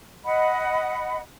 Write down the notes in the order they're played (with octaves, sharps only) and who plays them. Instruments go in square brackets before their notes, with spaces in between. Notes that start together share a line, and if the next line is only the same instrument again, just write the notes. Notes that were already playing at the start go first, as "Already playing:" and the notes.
[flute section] D#5 F#5 B5